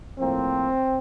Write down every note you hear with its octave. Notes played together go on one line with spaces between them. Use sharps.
A2 F3 A#3 C4